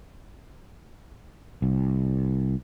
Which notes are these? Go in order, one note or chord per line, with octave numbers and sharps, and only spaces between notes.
C2